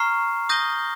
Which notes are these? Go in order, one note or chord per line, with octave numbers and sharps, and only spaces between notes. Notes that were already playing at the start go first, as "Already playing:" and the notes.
Already playing: A#5 C#6 F6 C7
D#6 G6 A#6 D#7 G7